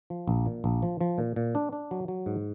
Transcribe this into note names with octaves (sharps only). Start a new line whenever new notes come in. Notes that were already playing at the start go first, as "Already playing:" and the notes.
F3
A#1
A#2
A#1
F3
F3
A#2
A#2
D4
D4
F#3
F#3
G#2